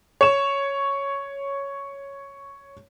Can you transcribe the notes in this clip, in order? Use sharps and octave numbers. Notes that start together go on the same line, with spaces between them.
C#5 E7